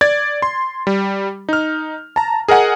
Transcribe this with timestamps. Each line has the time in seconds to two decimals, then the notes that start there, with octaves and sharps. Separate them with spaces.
0.01 D5 G#6 A6
0.42 C6
0.87 G3
1.49 D#4 F6
2.16 A5 A#5
2.48 G#4 A#4 D#5 F#5 G#5